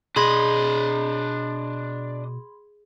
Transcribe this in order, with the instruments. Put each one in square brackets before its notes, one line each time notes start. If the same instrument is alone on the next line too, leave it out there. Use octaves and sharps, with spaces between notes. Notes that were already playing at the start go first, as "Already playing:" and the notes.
[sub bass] B2 [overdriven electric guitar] D4 D#5 [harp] G#4 [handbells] B5 C6 G#6